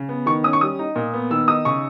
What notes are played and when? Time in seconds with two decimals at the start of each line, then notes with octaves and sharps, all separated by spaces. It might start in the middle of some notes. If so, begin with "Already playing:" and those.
Already playing: C#3
0.09 B3
0.26 D#3 C#6
0.44 C#4 D#6
0.53 C#6
0.61 G3 D#6
0.79 D#4
0.96 A#2
1.14 B3
1.30 D#3 E6
1.48 D#4 D#6
1.65 C#3 C#6